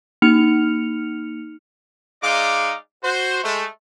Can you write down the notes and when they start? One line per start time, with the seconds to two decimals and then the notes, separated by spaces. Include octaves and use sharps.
0.22 A#3 D#4 F6 C#7 F7
2.23 G#3 D#4 D5 F5 D6
3.04 F#4 C5
3.44 G#3 A3